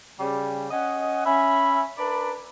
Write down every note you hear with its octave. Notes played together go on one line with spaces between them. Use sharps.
C#3 G3
C#4 D#5 F#5
C#4 E5 B5
D4 A#4 B4 D5 A#5 B5